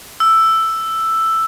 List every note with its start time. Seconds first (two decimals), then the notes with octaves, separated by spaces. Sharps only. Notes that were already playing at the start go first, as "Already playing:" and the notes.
0.20 E6